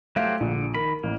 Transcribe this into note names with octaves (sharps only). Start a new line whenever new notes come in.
F#3 A3 G4 C5 F5
A#1 D3
D#3 A#4 B5
A1 A#3